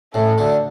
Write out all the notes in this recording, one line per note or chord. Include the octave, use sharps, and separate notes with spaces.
A1 A2 A4
D2 D3